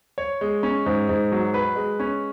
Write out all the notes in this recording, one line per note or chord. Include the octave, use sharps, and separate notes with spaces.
C#5
G#3
C#4
G#2
G#2
F#3
B4
G#3
C#4